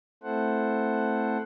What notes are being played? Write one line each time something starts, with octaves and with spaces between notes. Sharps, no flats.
A3 C4 E4 A4 C5 F#5